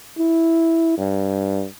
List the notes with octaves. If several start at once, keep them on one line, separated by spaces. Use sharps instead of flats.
E4
G2